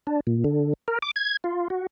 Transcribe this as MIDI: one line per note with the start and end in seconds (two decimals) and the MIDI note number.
0.07 0.20 62
0.27 0.44 46
0.44 0.73 50
0.88 0.99 70
1.02 1.11 86
1.16 1.37 92
1.44 1.68 65
1.70 1.87 66